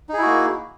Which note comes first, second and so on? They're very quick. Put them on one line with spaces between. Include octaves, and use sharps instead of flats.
D#4 G#4 E4 F#4 A#3